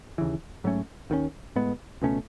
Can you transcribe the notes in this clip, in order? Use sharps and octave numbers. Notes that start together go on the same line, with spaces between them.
D#2 C#3 E3
G#2 F#3 A3 C#4
D#2 D#3 F#3 C#4
A2 G#3 B3
C#2 B2 A3 C#4